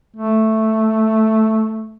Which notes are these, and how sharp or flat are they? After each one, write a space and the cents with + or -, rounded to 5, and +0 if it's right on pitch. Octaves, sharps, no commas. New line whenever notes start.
A3 +0